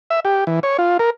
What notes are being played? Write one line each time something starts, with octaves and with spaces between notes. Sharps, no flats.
E5
G4
E3
C#5
F4
A#4